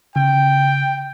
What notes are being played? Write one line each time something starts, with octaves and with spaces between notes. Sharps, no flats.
C#3 G5